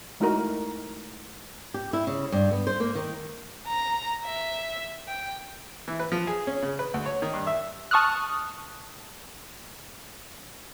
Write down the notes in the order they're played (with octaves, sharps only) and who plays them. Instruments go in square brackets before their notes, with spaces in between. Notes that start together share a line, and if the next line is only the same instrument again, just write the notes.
[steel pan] G#3 A3 D#4 E4 F#4 A#4
[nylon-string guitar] G4
E4
C#3
G2
B3
C5
A#3
D#3
[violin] A#5
E5
G5
[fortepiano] E3
B4
F3
G#4
C#4
C#3
B4
D2
C#5
D#3
G2
E5
[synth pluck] A5 C#6 D#6 F6 F#6